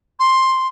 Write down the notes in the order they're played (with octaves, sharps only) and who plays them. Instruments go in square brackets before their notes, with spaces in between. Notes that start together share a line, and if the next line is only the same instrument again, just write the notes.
[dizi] C6